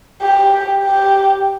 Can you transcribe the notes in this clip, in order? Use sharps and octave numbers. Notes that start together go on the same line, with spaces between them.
G4
G4